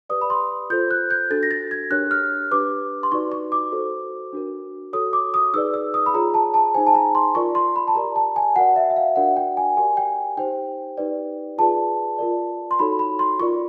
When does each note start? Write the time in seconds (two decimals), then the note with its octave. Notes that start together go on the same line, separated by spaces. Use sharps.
0.09 G4 B4 D5 D#6
0.21 B5
0.30 C6
0.70 F4 A4 C5 G6
0.91 F#6
1.11 G6
1.30 D4 F#4 A4 A6
1.43 A#6
1.51 A6
1.71 G#6
1.91 D4 G4 A#4 C#5 F#6
2.11 F6
2.51 D4 G4 B4 D6
3.03 C6
3.12 D#4 F#4 B4 D5 C#6
3.32 C#6
3.52 D6
3.72 F#4 A4 C5
4.33 D4 F#4 A#4
4.93 F#4 A4 C#5 D#6
5.13 D6
5.34 D#6
5.54 D#4 G#4 B4 D5 E6
5.74 E6
5.94 D#6
6.06 B5
6.14 F4 G#4 C#5 A#5
6.34 A5
6.54 A5
6.74 D#4 G#4 C5 G#5
6.86 A5
6.95 A#5
7.15 C6
7.35 F4 A#4 D5 C#6
7.55 C6
7.76 B5
7.88 A5
7.95 G4 A#4 D5 A#5
8.16 A5
8.36 G#5
8.56 F#4 A#4 D5 F#5
8.76 E5
8.90 E5
8.96 F5
9.16 D4 F#4 A#4 D5 F#5
9.37 G5
9.57 G#5
9.77 G4 A#4 D5 G#5
9.97 G5
10.37 D#4 G4 C5 G5
10.98 D#4 G4 B4 D5
11.58 F4 G#4 B4 D5 A5
12.18 F4 A#4 D5
12.71 C6
12.79 D#4 F#4 A4 C#5 B5
12.99 B5
13.19 C6
13.39 F4 A#4 D5 C#6